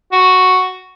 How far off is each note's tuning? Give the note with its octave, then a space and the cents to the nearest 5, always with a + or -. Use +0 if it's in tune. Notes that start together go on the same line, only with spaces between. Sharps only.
F#4 +0